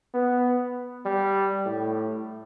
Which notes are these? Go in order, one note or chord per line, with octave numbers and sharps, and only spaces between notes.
B3
G3
A2